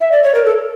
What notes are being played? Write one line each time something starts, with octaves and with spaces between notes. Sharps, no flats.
E5
D5
C#5
A#4
A4